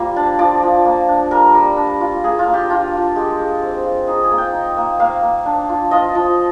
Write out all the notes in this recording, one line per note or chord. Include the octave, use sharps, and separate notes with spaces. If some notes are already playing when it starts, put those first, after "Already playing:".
Already playing: G3 A#3 F4 F5
D4 D5
F3 D5
F3
A#3
D4
G3 A#4
G3
D4
F4
A#3 G#4
F4
A#3
G4
D4 F4
F4
G#3 G4
G#3
C4
F4
D#4 G#4
G#4
A#3
G5
D#4
A#3
A#3 F5
A#3
D4
F4
F4 D#5
F3